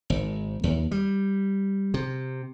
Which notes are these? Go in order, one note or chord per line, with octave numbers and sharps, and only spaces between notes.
G#1
D#2
G3
C3